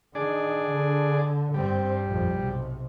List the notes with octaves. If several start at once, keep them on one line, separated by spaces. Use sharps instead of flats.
D#3 D4 G#4 D5
D3
G2 G3 C4
A#1 F2
B1 C3